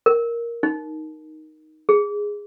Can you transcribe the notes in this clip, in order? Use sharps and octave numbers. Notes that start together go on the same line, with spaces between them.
A#4
D#4
G#4